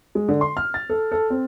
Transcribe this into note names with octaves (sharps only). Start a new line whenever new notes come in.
G#3
D3
C6
F6
A6
A4
A4
C4